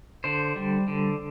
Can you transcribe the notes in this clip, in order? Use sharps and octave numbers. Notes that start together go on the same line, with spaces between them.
D3 C5
G3
D3